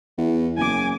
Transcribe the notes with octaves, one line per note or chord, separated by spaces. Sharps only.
E2
F#1 G#5 D6